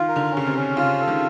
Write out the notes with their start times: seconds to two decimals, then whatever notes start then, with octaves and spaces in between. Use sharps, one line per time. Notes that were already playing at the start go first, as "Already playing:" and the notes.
Already playing: D#3 F4
0.08 A#4
0.16 D3
0.31 C#4
0.37 C#3
0.46 C3
0.55 C#4
0.77 C#3 F4
1.00 A4
1.08 D#3